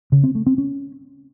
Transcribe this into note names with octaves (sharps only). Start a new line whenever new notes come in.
C#3
C4
A3
C4
C#4